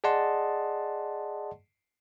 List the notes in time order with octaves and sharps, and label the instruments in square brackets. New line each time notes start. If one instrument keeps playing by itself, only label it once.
[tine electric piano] G#4 D5 D#5 F#5 A5 C6